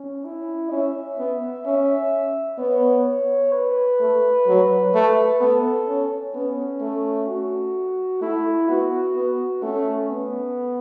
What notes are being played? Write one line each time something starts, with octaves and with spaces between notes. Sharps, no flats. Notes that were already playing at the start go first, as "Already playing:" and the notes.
Already playing: C#4
E4
C#4 E5
B3
C#4 E5
B3 C#5
B4
A3
F#3
A3
B3 A4
C#4
B3 C#4
A3
F#4
A3 E4
B3 F#4
B3
A3 C#4
B3